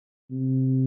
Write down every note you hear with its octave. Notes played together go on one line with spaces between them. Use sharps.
C3